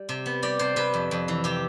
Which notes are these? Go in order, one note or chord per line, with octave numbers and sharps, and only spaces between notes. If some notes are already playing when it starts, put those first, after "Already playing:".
Already playing: G3
C3
B3
G3 D5
C3 C5
C3 B4
F2
F2
E3
C3 G4